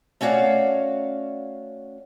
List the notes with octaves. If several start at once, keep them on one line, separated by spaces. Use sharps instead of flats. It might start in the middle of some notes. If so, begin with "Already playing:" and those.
A3 C#4 F#4 D5 F5 F#5